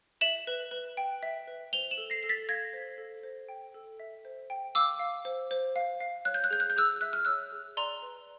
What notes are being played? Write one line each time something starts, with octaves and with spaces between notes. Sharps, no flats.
E5 E7 F#7
B4
B4
G5
E5
B4
C5 F7 G7
E7 F#7
A4
A#6 C7
A4 C7
A6 B6
F5 G#6 A#6
C5
A4
C5
G5
A4
E5
C5
G5
F5 D6 E6
F5
C5
C5
F5
F5
C#5 F#6
G6
F#6
G#4 G6
F#6
G6
G#4 E6 F#6
E5 F#6
F6
C#5 E6 F#6
G#4
D5 A#5 C6
B4